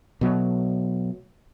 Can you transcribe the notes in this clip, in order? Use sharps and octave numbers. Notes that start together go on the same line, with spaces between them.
B2 F#3 A3